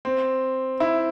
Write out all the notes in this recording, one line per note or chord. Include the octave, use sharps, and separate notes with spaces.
C4
E4